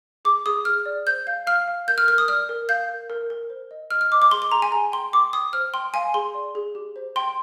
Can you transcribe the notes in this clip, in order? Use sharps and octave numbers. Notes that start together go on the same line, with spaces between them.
G#4 D6
G#4 D#6
G#4 F6
D5
C5 G6
F5 G6
F5 F6
F5
A#4 G6
F6
A#4 F6
D#6
D5 F6
A#4
F5 G6
A#4
A#4
A#4
C5
D#5
D#5 F6
F6
D#5 D6
D6
G#4 C6
C6
G#4 A#5
G#5
G#4 A#5
G5 C6
G5 D6
G5 D#6
C5 F6
G5 C6
F5 G#5
G#4 C6
D5
G#4
G4
C5
G5 C6